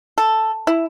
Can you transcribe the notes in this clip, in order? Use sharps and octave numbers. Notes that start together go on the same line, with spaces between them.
A4
E4